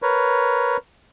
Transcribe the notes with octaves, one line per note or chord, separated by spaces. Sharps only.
A#4 B4 C#5